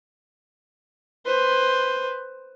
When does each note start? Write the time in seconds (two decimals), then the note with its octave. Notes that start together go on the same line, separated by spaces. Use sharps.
1.25 B4 C5